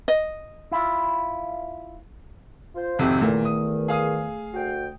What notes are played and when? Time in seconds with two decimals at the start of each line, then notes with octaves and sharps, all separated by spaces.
0.08 D#5
0.72 E4 F4
2.76 F4 C5
2.99 G#1 F2 C3 A3 C4
3.22 E2 A#2 D#3 A3
3.45 D#6
3.88 G#4 F5 D#6
4.54 D2 F#4 G5